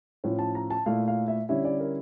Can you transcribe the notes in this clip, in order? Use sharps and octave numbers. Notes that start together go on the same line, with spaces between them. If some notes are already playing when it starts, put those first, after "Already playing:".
A2 F3 C#4 C#5
A5
A#5
A5
A#2 A3 E4 F5
F5
E5
D3 G3 C#4 E4 E5
D5
A#4